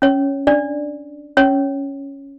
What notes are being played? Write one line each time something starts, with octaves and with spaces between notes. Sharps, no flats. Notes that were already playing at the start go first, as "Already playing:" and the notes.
C#4 C#5
D4 D5
C#4 C#5